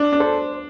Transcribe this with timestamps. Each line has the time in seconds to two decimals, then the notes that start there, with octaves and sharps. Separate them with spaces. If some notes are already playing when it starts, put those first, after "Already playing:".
Already playing: D4
0.12 D4
0.20 A4 C5